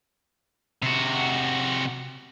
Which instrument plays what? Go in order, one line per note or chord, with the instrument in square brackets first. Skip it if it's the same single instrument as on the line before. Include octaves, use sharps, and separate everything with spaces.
[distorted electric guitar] C3 F#4